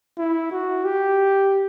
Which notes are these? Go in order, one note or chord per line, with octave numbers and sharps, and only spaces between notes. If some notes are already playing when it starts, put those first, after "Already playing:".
E4
F#4
G4